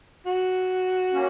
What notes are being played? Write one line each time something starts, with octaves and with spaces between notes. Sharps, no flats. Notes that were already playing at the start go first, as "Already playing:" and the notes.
F#4
A#3 C#4